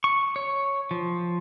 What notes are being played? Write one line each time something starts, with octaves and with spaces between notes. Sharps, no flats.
C#6
C#5
F3